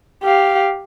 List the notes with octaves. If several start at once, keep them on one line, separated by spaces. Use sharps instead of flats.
G4 F5